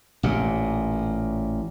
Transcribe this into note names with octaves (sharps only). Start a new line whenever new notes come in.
A1 A#2